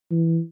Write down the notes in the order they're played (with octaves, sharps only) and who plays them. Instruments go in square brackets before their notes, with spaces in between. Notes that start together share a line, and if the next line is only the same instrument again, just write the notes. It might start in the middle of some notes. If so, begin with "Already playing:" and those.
[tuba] E3